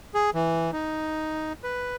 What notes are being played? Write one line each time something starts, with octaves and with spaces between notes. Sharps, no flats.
G#4
E3
D#4
B4